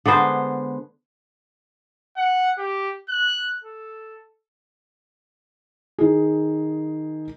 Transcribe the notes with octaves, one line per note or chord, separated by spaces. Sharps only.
D3 G#3 B3 C5
F#5
G4
F#6
A4
D#3 G#4